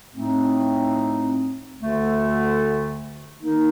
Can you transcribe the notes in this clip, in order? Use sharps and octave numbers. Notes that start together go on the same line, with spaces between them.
A2 A3 C4 D#4
D2 D3 A3
D#3 A#3 D#4 A#4